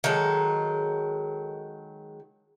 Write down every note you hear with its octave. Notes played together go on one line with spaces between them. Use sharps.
D#3 F#3 G#3 A4